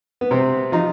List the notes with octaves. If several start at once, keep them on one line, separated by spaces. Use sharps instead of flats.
B3
C3 C4
F3 D#4